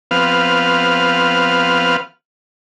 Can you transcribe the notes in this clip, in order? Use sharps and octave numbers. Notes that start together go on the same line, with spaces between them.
F3 B3 C4 B4 F5 F6